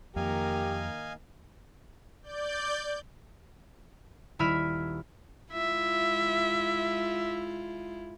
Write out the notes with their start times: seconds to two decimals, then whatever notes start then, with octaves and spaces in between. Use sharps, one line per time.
0.16 F2 D#3 A#3 G4 A#4 D#5 F5 G#5
2.23 D5 G6
4.39 D#1 E4 E5 B5 F6 D#7
5.53 G#3 E4 F4 E5